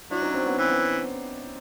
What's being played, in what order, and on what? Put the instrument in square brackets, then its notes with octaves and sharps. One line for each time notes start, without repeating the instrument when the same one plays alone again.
[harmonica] F#3 [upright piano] D4 E4
[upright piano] C#4 D#4
C4 D4
B3 C#4
[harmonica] E3 [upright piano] C4
[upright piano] B3